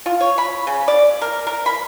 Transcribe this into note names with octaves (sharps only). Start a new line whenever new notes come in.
F4
C#5
B5
C#3
D5
A#4
A#4
B5